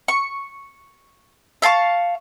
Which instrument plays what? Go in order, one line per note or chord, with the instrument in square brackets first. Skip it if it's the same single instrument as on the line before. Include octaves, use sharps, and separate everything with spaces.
[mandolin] C#6
E5 F5 A5 C#6